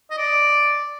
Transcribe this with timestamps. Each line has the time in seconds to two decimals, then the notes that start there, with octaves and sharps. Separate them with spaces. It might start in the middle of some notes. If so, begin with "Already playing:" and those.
0.11 D#5
0.18 D5